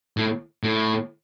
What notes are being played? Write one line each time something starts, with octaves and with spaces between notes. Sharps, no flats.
A2
A2